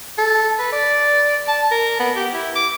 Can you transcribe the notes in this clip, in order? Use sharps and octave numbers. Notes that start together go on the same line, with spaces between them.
A4
B4
D5
A5
A#4
B3
G4
E4
D6